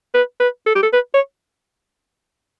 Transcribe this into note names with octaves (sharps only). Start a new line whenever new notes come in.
B4
B4
A4
G4
A4
B4
C#5